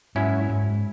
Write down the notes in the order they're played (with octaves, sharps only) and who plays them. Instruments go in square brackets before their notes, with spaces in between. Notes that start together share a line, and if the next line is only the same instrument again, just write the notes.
[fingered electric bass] G#2 [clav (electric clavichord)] F#3 C#4 E4
[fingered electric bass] G#2